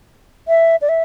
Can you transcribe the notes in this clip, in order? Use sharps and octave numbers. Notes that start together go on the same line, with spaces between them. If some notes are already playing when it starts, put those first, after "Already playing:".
E5
D5
E5